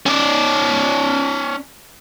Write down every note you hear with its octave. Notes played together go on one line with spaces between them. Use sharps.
C#4 D5